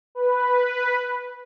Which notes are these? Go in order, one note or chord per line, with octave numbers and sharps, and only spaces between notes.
B4